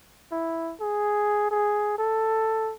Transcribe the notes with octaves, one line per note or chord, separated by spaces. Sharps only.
E4
G#4
G#4
A4